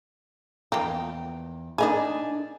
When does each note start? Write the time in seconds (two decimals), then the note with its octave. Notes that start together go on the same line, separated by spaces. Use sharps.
0.72 E2 F3 A#3 D#4 G5
1.78 D4 D#4 G#4 A#4 D#5 G#5